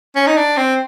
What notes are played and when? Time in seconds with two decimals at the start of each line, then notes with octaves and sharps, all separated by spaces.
0.15 C#4
0.27 D#4
0.37 D4
0.57 C4